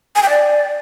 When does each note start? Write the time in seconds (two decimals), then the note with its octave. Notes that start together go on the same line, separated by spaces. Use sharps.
0.16 G#5
0.22 G5
0.29 D5